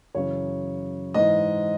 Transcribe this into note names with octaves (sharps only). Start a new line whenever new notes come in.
F#2 C#3 E3 C#5
G#2 E3 D#5